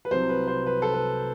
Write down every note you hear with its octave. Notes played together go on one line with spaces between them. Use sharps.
B4
C2 C3 F#3 C5
B4
C5
B4
A4
B4